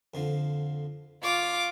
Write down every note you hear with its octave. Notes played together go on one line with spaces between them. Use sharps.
F2 D3 F3
F4 C#5 D5 F5 D6